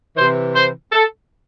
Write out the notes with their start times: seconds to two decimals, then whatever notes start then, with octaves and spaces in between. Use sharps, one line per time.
0.16 C3 E3 C5
0.54 C5
0.92 A4